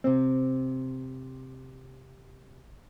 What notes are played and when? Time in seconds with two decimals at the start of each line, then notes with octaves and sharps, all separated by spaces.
0.04 C3 C4